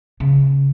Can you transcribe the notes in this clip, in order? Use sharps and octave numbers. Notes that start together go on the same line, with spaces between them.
C#3